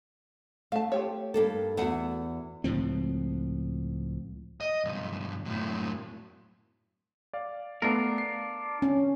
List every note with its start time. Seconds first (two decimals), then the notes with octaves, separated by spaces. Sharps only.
0.72 A3 F5 A5
0.92 F4 G4 C#5
1.34 G2 A#3 A4
1.77 E2 A3 F#4 F#5
2.64 C#2 A2 F3 C4
4.61 D#5
4.85 B1 G2
5.45 F#2 A2
7.33 D5 F5
7.82 A3 B3 D4 F4 A#4
8.18 C7
8.82 C#4